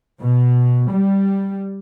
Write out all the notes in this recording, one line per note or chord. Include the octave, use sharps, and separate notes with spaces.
B2
G3